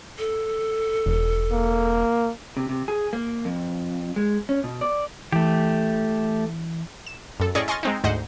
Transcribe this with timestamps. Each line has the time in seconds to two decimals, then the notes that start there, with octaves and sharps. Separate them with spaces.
0.19 A4
1.06 E1
1.52 A#3
2.57 C3
2.69 C3
2.88 G#4
3.13 A#3
3.45 F2
4.16 G#3
4.49 C#4
4.64 B2
4.81 D5
5.33 E3 A3 G4
7.06 E7
7.40 F#2 A4
7.55 A2 C#4 G#4 D5 D#5 C#6
7.68 D#5 G#5 C6 C#6 F6 A6
7.83 G#3 C4 D#4
8.04 D2 G#2 C5 D#5 F#5